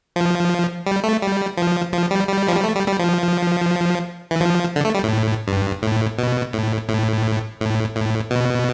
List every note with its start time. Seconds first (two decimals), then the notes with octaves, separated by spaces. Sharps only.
0.16 F3
0.86 G3
1.04 A3
1.22 G3
1.57 F3
1.93 F3
2.11 G3
2.28 G3
2.48 F3
2.56 G3
2.64 A3
2.75 G3
2.88 G3
2.99 F3
4.31 E3
4.41 F3
4.76 D3
4.85 A3
4.94 G3
5.03 A2
5.48 G2
5.82 A2
6.18 B2
6.53 A2
6.89 A2
7.61 A2
7.96 A2
8.31 B2